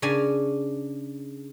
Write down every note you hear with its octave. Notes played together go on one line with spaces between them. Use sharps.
C#3 D4 D5 G#5 A#5